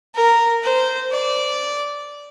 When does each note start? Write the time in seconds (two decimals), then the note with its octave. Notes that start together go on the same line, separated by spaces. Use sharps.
0.15 A#4
0.64 C5
1.13 D5